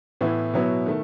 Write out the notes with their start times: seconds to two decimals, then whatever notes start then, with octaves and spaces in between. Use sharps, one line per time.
0.21 A2 E3 B3 E4
0.54 B2 F#3 B3 E4
0.86 D#3 A3